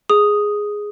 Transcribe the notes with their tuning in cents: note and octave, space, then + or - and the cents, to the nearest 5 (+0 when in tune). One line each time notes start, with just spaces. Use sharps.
G#4 +0 D#6 +0